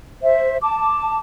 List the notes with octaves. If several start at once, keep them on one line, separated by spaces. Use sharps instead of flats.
C5 E5
A5 D6